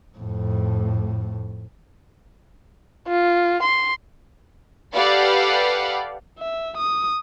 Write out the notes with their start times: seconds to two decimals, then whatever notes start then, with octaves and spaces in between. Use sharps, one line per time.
0.18 F2 A2
3.08 F4
3.62 C6
4.95 G4 A4 B4 D5 F5 F#5
6.39 E5
6.77 D#6